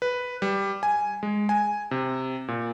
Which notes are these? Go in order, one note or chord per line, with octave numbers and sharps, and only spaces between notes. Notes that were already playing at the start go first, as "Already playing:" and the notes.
B4
G3
G#5
G#3
G#5
C3
A#2